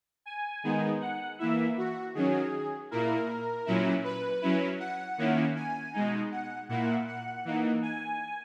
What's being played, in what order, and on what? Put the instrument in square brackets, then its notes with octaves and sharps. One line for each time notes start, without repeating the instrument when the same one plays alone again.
[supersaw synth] G#5
D#3 G#3 B3 D#4
F#5
E3 A#3 E4 E5
F#4
D#3 F#3 C#4 G#4
A#2 A#3 E4 A#4
A#2 F#3 C#4 E4
B4
F#3 C#4 E4
F#5
D#3 A#3 C#4 E4
G#5
B2 G#3 D#4
F#5
A#2 A#3 E4 F#5
F#5
E3 A#3 D#4
G#5